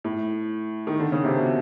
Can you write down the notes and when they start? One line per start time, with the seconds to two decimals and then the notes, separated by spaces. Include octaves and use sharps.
0.04 A2
0.87 D#3
1.00 D3
1.12 C#3
1.25 C3
1.37 B2